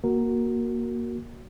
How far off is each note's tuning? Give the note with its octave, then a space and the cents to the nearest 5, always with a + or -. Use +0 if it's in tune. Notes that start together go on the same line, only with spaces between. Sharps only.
A#3 +15 F#4 +0 A#4 +0